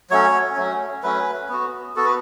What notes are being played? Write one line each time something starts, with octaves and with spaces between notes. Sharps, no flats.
F#3 A3 C#4 C#5
F#3 A3 C#4
F#3 A3 C#4 B4
B3 F#4
B3 F#4 A4
B4